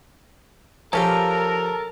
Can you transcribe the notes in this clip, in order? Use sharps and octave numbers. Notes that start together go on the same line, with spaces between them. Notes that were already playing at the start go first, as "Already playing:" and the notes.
F3 C#4 G4 A4 A#4 F5 A5